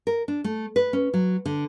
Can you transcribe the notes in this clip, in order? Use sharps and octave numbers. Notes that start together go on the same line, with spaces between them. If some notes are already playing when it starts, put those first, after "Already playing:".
A#4
D4
A3
B4
C#4
F#3
D3